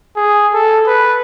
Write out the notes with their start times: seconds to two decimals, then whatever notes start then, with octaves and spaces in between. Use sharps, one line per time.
0.16 G#4
0.54 A4
0.87 B4